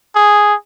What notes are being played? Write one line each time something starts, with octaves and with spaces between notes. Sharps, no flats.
G#4